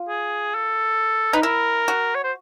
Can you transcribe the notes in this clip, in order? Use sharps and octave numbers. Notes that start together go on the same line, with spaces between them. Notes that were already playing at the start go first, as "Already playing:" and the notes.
Already playing: F4
G#4
A4
D#4 B4
E4 A#4
F#4
C#5
C5